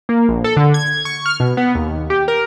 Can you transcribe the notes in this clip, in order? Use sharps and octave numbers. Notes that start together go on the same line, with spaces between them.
A#3
A#1
A4
D3
G#6
C#6
F6
B2
B3
D#2
G4
A#4